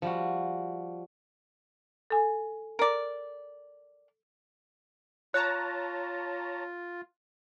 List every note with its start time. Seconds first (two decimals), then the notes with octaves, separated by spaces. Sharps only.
0.02 F3 G3 F#4
2.10 A4 G#5
2.79 A#4 D5
5.34 F4 C#5 A5 A#5 F#6